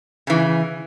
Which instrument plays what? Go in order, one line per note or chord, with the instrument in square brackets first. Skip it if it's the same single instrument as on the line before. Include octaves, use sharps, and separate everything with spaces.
[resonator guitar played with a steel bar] C#3 E3